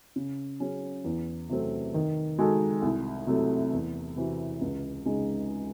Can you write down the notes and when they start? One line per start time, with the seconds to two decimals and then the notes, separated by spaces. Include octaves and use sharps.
0.16 C#3
0.60 F#3 C#4 G#4
1.04 E2
1.49 C3 F#3 A3 C4
1.94 D#3
2.39 G#3 D#4 F#4 A4
2.82 C2
3.27 C3 F#3 A3
3.72 E2
4.16 C3 E3 C4 F#4
4.61 C#2
5.05 C#3 G#3 D#4 G#4